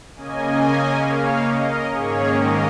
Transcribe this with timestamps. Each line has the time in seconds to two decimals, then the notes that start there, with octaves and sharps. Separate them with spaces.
0.16 C#3 A#3 C#4 D#5 G#5
1.03 C#5 F5
1.47 A#4 D#5
1.91 G#2 D#3 A#3 C#4 G#4 C#5
2.34 A#4 D#5